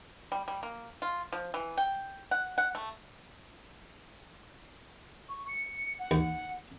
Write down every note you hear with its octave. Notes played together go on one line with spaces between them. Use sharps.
G3
G3
A#3
F4
F3
E3
G5
F#5
F#5
A3
C#6
C#7
F#5
D#2